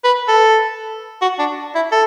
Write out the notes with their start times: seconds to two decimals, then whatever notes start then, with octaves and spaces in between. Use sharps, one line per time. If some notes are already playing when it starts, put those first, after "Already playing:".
0.04 B4
0.28 A4
1.22 F#4
1.39 D4
1.75 E4
1.92 A4